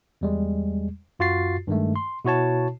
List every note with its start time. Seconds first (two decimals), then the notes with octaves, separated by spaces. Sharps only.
0.21 E2 G3 G#3
1.19 F#2 F4 F#4 A6 C7
1.67 G2 D#3 G#3 A3
1.96 C6
2.25 B2 E4 F#4 C#5 A5